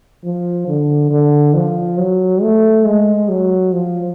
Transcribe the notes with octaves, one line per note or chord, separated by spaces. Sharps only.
F3
D3
D3
F3
F#3
A3
G#3
F#3
F3